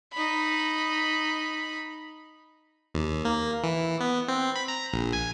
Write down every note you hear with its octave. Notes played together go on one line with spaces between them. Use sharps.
D#4 B5
D#2
A#3
E3
B3
C4
B5
A#5
A#1
G#5